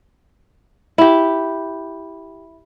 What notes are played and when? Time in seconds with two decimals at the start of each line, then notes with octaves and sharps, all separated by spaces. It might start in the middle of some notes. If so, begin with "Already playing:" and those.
0.98 E4 G4